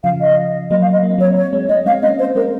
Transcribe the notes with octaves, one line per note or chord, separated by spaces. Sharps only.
C#3 F3 F5
D#5
F#3 A#3 D#5
F5
D#5
A#3
C4
F#3 A#3 C#5
C#5
G#3 C4
G#3 C4 D#5
G#3 C4 F5
A#3 C#4 D#5
C5
G#3 C4 A#4